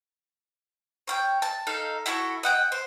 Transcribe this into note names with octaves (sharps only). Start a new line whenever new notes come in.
C#5 F5 G5
A5
D#4 A4 F5
E4 F#4 A4 C#6
D#5 F#5 G5
C5